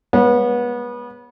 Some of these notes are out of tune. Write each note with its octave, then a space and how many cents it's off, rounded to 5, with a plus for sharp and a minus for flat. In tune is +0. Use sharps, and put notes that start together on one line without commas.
G#3 +0 B3 -25 C#5 +0